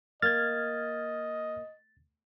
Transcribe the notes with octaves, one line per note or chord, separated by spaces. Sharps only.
A#3 D#5 F6 G#6 A6